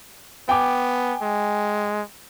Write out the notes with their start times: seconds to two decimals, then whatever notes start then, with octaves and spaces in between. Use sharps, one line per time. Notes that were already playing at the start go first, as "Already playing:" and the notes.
0.49 B3 G5 G#5 D6
1.22 G#3